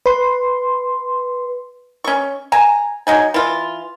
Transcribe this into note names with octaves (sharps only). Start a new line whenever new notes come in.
B4 C6
C#4 C#6
G#5 A#5
F#3 D#4 G#5
E3 F4